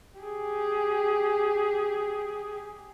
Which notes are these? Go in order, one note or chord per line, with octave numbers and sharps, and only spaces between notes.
G4 G#4